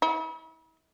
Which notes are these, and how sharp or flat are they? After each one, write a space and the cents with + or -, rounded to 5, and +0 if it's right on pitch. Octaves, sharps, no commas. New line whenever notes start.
E4 -40